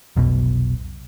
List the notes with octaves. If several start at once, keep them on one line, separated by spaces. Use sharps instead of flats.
F1 B1 B2